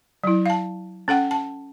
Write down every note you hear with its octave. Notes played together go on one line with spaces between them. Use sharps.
F#3 E4
F5 A5
C#4 A4 F#5 G5
A5